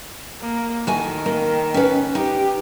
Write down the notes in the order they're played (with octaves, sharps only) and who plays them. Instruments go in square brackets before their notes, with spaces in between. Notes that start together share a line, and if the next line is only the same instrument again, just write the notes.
[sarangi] A#3
[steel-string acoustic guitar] A2 F#4 G#5 [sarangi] D#3
[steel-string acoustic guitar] A#3
C#4 B4
[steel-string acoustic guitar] D#4 [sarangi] G4